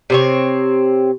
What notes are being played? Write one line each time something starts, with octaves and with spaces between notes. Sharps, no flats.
C3 C4 C#5